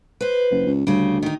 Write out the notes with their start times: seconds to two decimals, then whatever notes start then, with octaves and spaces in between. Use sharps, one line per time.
0.21 B4 C5
0.51 F#1
0.67 C#2
0.87 D2 C#3 G3
1.23 D#3 D#4